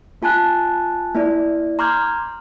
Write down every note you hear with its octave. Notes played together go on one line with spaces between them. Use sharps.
A#3 F4 G#5 A5 F#6
A#3 E4 D5
A#5 C6 D6 F6 G6 G#6